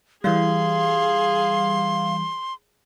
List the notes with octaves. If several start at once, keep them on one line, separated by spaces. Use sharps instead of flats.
E3 G3 G#4 F5 C6